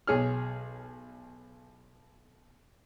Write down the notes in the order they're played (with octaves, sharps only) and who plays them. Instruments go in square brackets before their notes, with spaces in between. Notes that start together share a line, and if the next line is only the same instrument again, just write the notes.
[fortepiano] B1 G#4 C#5 F6